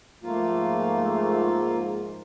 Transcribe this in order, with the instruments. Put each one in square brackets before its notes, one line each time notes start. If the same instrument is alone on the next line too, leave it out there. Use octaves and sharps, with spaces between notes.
[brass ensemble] G#2 F3 [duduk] A3 [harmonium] A#3 F4